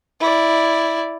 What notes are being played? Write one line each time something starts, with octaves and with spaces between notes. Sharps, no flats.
E4 D5